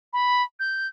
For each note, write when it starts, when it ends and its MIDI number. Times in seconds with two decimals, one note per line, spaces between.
0.13 0.42 83
0.60 0.87 91